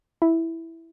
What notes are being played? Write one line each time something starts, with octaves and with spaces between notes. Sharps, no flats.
E4